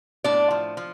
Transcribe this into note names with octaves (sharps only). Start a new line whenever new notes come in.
A2 D4 D5
F3
F3